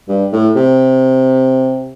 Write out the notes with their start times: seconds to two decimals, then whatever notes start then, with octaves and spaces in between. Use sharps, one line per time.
0.09 G2
0.32 A2
0.55 C3